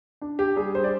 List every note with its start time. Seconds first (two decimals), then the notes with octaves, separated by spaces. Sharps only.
0.21 D4
0.39 G4
0.56 G3 G#4
0.75 C5
0.84 D5